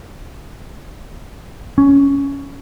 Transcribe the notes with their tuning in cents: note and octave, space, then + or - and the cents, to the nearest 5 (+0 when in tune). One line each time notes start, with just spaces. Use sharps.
C#4 +10